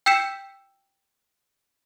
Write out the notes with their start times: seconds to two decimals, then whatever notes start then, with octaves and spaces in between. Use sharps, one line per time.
0.06 G5 E6 G6 B6 C#7 E7